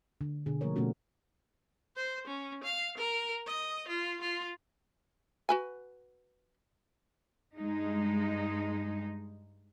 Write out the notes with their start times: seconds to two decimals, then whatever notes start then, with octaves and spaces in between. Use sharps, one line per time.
0.21 D3
0.46 B2 D3 G#4
0.61 F3 A3 A#3 A#4 C#5
0.76 B2 A3 B3 C#4 F#4
1.96 C5
2.27 C#4
2.63 F5
2.97 A#4
3.46 D#5
3.88 F4
4.21 F4
5.49 F#4 B4 G#5
7.56 G2 G#3 D#4